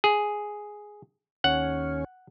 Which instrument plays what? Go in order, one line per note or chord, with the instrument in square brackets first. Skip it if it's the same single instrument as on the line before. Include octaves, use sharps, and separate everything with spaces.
[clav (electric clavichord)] G#4
[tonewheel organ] D#2 C#4 [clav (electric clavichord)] F#5